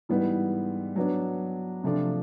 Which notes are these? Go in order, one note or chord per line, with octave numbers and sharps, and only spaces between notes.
G#2 E3 G3 B3
F#3 B3 D4
C3 F3 A3 D4 F4